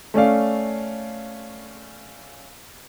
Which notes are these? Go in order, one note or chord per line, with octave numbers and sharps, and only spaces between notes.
A3 C#4 D5 F5